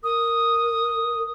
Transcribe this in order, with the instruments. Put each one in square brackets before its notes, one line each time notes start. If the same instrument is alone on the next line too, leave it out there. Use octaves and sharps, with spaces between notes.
[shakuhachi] A#4 [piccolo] D#6